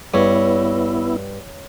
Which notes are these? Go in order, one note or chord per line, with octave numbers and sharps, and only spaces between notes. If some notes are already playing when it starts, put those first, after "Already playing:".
G2 B3 E4 C#5